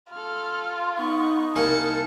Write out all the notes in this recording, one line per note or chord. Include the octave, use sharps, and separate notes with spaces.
F4 A4 F6
B3 D#4 C#6
C2 A#3 G#5 A5 C#7